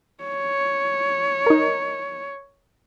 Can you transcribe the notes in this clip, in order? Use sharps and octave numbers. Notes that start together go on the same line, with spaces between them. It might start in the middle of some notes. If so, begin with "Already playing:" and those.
C#5
D#4 A#4